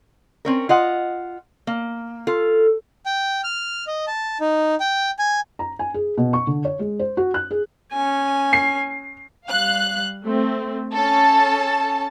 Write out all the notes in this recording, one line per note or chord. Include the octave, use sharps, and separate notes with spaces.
C4 C#4 A#4
F4 D#5 F#5
A#3
F4 A4
G5
F6
D#5
A5
D#4
G5
G#5
A#5
G#5
G#4
B2
C#6
D3
C#5
G#3
C5
F#4
F#6
G#4
C#4 G#5
C7
G3 F5 F#6
A3 C4
C#4 A4 A5